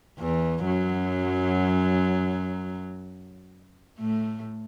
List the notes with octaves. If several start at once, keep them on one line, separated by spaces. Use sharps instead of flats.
E2 E3
F#2 F#3
A2 A3